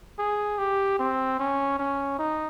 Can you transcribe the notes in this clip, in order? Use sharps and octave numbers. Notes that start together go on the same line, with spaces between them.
G#4
G4
C4
C#4
C#4
D#4